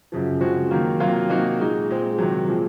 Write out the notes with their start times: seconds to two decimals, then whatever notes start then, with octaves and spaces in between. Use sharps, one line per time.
0.12 F#2 C#3 F3
0.41 C#3 F3 G#3 C4 F#4
0.71 D#3 F#3 A#3
1.00 C3 F#3 A#3 F4
1.29 C3 F#3 A#3 D#4 F#4
1.60 A#2 G#3 D#4
1.89 A#2 G#3 C4
2.18 C3 D#3 F#3
2.48 A#2 F3 G#3